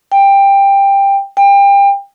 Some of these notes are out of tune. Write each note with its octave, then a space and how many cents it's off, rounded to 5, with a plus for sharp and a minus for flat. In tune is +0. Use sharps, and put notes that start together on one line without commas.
G5 +15
G5 +30